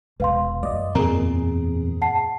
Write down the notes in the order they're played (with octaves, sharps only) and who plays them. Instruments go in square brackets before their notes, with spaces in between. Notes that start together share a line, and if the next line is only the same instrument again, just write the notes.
[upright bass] E1 [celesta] B4 F5 C6
[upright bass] F#2 [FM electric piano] D5 D#5
[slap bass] E2 C4 [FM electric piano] A#2 G#4 [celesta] A#4 A#5
[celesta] F#5 A5 C7